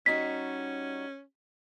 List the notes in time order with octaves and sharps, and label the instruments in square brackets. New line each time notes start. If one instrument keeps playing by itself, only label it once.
[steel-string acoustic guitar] G3 D#4 F#4 [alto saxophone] C#4 [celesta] B6